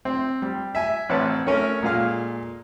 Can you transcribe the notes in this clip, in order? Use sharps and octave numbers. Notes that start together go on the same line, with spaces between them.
C4
G3
E5 G#5
A1 C4 B4 C#5 F#5 A5
A3 C#4 A#4 C#5
A#2 G#3 A4 F5 F6